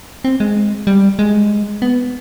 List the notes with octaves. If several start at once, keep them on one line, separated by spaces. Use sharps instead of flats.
C4
G#3
G3
G#3
B3